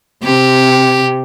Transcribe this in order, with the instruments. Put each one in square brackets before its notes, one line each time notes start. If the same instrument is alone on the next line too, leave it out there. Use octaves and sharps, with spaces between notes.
[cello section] C3 [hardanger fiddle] G4